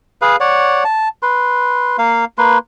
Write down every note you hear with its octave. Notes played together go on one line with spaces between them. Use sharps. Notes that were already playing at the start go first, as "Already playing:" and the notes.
G#4 B4 F5
C#5 D5 F#5
A5
B4 C6
A#3 F5
A#3 B4 C6